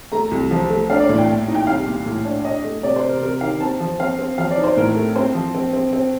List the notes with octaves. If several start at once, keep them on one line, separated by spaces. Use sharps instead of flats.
A3 A#5
C2
F3
A3
D4 F5
D5
A2
G5
A#2
D#4
G5
C2 F5
A#2
A2
D4
D4 D#5
A3
C3 D5
C5
C3
A#4
C3 A#4
D#3 F5
C4 A5
F3
C4 F5
C4
F3 F5
D5
D#4
C5
A2 A#4
A3
C4 C5
F3
C4
C4
C4